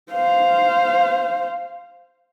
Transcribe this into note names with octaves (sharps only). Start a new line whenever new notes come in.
C5 F5